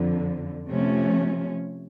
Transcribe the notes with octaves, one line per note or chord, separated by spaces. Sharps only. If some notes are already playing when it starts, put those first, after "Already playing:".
Already playing: F2 D3 F3
C3 F3 A3 C#4